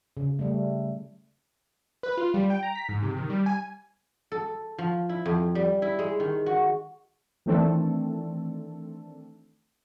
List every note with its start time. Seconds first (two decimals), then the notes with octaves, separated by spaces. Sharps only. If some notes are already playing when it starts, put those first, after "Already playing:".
0.17 C#3
0.39 G3 A3
2.03 B4
2.17 F4
2.34 G3
2.50 G5
2.63 A#5
2.75 B6
2.89 G#2
3.03 C3
3.17 D#3
3.30 G3
3.46 G#5
4.32 A4
4.78 F3
5.09 E4
5.26 F2
5.55 G3
5.82 E4
5.99 G#3
6.20 D#3
6.46 F#4
7.46 D#3 E3 A3 C4 D4 A4